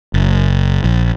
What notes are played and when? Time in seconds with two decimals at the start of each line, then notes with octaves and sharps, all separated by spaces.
0.14 F#1
0.84 A#1